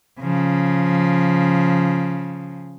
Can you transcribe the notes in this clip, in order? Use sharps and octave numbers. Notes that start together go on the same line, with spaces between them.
C#3 F3